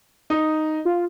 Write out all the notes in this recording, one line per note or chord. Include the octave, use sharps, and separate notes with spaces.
D#4
F4